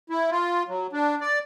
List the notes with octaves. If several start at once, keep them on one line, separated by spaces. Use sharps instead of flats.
E4
F4
F#3
D4
D5